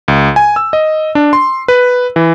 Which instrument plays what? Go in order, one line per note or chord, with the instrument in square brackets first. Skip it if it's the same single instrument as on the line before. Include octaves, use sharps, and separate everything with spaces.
[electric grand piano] C#2
G#5
E6
D#5
D4
C6
B4
E3